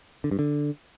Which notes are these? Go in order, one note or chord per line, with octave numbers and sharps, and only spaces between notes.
D3
G2
D3